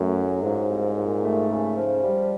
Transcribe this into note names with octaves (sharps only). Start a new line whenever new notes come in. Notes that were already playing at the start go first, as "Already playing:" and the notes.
Already playing: F#2 A2 A3
F#3
G#2 F3
C2
A#2
A3
C#3
F3
G3